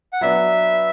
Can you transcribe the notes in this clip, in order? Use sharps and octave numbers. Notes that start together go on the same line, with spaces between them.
F#5
F#3 B3 D4 E5